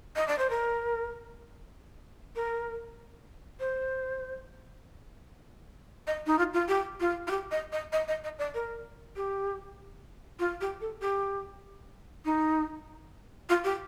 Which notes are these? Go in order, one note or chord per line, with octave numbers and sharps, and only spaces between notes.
D#5
D5
C5
A#4
A#4
C5
D#5
D#4
F4
F4
G4
F4
F4
G4
D#5
D#5
D#5
D#5
D#5
D5
A#4
G4
F4
G4
A4
G4
D#4
F4
G4